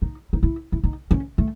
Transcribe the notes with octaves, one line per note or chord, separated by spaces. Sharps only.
D#4
D#4
E4
E4
D#4
C#4
A3